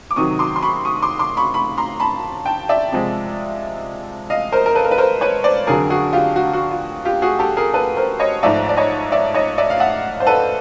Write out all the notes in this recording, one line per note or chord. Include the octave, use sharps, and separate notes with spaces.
D6
C3 D#3 F#3 C#6 D#6
C6 D6
C6
B5 C#6
C#6 D#6
C6 D6
C6 D6
B5 C#6
B5 C#6
A#5 C6
A5 B5
G5 A5
D5 E5
C3 F3 G#3
D#5 F5
A#4 C5
A#4
A4 B4
A#4
B4
A#4 C5
B4 C#5
C5 D5
F2 D3 F#3 G#4 A#4
F#4 G#4
F4 G4
F#4
F#4
F4
F4 G4
F#4 G#4
G4 A4
G#4 A#4
A4 B4
A#4 C5
C#5 D#5
G#2 F3 A3 D5 E5
D5
C#5 D#5
D5 E5
C#5 D#5
D5 E5
F5
E5 F#5
C5
A4 B4